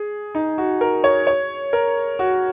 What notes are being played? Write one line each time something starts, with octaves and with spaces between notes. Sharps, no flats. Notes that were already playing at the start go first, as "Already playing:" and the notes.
Already playing: G#4
D#4
F#4
A#4
C#5
C#5
A#4
F#4